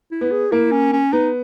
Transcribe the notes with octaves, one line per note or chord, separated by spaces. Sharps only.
E4
B3
G#4
A#3 E4
C#4
C#4
B3 D#4